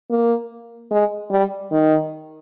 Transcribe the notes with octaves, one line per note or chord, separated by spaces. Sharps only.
A#3
G#3
G3
D#3